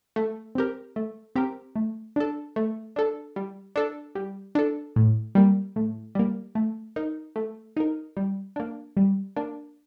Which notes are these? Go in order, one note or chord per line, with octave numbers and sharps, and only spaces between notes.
A3
C4 G4 A#4
A3
C4 G4 A#4
A3
D4 A4
A3
D4 A4
G3
D4 A4
G3
D4 A4
A2
G3 A#3
A2
G3 A#3
A3
D#4 A#4
A3
D#4 A#4
G3
A#3 D4
G3
A#3 D4